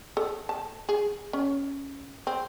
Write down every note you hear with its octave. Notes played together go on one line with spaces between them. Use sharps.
A4
A5
G#4
C#4
C4